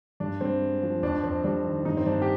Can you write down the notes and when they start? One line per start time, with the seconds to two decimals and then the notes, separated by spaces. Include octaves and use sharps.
0.20 G2 D4
0.41 G2 C4
0.62 G#3
0.82 F3
1.03 F2 D4
1.23 F2 C4
1.44 G3 D4
1.65 D#3
1.85 G2 D#4
1.97 C4
2.06 G2 D4
2.22 G4